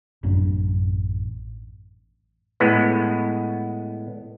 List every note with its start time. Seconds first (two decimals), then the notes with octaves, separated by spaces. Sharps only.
0.23 A1 F#2 D4
2.60 A2 G#3 B3